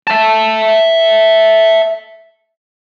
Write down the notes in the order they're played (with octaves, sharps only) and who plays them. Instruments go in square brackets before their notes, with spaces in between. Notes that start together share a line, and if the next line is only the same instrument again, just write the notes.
[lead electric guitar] E5 A5